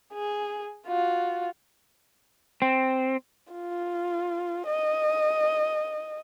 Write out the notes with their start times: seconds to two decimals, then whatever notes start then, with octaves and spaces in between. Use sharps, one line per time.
0.13 G#4
0.87 F4 F#4
2.62 C4
3.53 F4
4.68 D#5